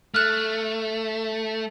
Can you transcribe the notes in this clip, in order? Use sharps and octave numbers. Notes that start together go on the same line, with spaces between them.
A3 F6 F#6